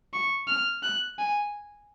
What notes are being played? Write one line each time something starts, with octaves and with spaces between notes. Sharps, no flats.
C#6
F6
F#6
G#5